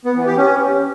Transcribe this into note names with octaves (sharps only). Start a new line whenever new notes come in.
B3
E3
G4
C#4